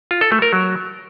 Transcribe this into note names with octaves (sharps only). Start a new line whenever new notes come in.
F4
A4
A3
A#4
F#3